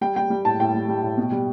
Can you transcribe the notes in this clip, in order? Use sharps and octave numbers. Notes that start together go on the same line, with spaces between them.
G3 G5
G3 G5
G3
A2 A5
A2 G5
G3
G3
A2
B2
G3